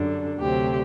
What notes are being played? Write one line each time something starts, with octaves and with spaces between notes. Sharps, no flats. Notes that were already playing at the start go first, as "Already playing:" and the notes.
Already playing: F#2 D3 G3 D4
D2 C3 F#3 C4 G4